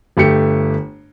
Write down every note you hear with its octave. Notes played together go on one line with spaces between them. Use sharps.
G1 A3 G4 C#7